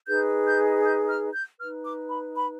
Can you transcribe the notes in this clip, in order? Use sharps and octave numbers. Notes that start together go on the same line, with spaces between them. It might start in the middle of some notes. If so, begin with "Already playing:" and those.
D#4 G#4 B4 G6
G6
G6
F6
G6
D#4 B4 F6
D6
B5
B5